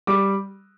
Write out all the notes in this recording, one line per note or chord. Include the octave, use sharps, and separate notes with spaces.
G3 D6